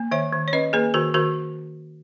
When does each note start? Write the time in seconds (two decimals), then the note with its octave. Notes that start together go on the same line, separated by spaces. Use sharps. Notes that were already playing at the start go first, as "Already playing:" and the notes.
Already playing: A#3
0.11 D#3 C#5 E5
0.33 D#3
0.48 C#5
0.53 C#4 B4 D#5
0.73 A#3 G#4 B4
0.94 D#3 F#4 A#4
1.14 D#3 F#4 A#4